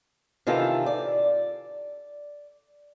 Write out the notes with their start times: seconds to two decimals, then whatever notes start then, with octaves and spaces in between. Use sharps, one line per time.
0.47 C3 D#3 E3 F4 A4
0.86 D5